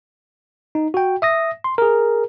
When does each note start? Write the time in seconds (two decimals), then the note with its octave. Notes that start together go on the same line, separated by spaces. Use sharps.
0.75 D#4
0.94 F#4 G5
1.22 E5 D#6 A#6
1.64 C6
1.78 G#4 A#4